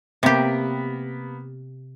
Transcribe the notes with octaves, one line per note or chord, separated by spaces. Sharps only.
C3 A#3 B3 G4